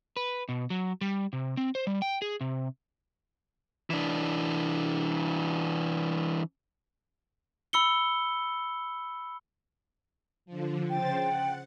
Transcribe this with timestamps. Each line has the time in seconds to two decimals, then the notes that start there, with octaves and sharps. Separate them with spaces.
0.17 B4
0.49 B2
0.70 F#3
1.01 G3
1.33 C3
1.57 C4
1.75 C5
1.87 G3
2.02 G5
2.22 G#4
2.41 C3
3.90 E3 D4
7.73 B5 E6 C#7 G7
10.46 D3 F3
10.89 C#3 C5 G5 A6
11.22 F#5